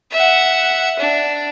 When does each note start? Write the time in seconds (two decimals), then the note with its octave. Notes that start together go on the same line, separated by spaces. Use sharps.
0.12 E5 F#5
0.99 D4